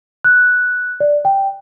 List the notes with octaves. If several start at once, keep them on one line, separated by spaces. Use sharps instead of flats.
F#6
D5
G5